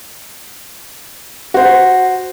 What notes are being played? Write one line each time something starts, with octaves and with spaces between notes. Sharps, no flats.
F#4 C5